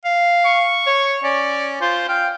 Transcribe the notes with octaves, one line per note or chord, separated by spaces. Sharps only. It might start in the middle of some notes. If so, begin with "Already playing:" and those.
F5
C#6
C#5
C#4 D5
F4 C5
F5 G5